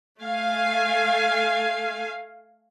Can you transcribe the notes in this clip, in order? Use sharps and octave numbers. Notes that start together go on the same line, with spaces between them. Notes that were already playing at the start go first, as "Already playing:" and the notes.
A3 F5 G#5